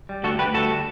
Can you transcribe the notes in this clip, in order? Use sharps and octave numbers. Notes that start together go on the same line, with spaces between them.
G3
D2 F#4 A4
D2 G4 B4
G3 F#4 A4